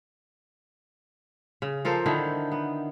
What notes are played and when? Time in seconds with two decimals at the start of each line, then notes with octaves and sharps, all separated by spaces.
1.62 C#3
1.85 F3 A4 A#4 C5
2.06 D3 D#3 D#4 E4
2.52 B3